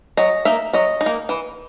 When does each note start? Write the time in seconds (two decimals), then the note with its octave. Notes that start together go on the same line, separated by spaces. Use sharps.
0.17 F#3 D#5
0.45 A#3 D#4 E5
0.73 F#3 D#5
1.01 D#4
1.06 A#3
1.29 E3